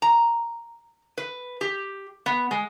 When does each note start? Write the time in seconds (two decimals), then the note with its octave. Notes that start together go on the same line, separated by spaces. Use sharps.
0.02 A#5
1.18 B4
1.61 G4
2.26 B3
2.51 G#3